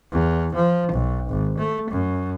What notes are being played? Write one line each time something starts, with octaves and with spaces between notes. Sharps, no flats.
E2
F3
B1
G#1
A3
F#2